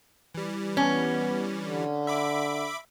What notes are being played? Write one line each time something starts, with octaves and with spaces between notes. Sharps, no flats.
E3 G3
B3 C#4
D3
E5 B5 D6